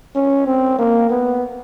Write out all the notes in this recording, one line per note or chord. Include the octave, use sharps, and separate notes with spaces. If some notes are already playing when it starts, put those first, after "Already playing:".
C#4
C4
A#3
B3